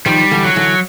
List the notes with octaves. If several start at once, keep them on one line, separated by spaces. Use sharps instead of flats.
D#3 F3 G3
D3 E3
F#3
D3 E3